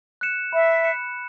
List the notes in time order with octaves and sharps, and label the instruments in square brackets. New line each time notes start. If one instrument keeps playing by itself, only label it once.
[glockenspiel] F#6 C#7 E7
[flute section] E5 [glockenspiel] B5
[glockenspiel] F#6 C#7 E7